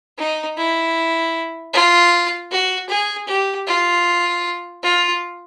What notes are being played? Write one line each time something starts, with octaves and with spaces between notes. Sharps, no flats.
D#4
E4
F4
F#4
G#4
G4
F4
F4